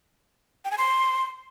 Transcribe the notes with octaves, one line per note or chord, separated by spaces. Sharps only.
G5
G#5
C6